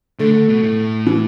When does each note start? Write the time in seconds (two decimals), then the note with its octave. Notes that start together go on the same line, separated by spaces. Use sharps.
0.19 D3 A3
0.34 D3
0.48 B2
0.63 A2
1.07 E3